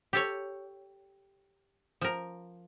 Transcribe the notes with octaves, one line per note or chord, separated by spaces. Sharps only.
G4 A4 C#5
F3 A#4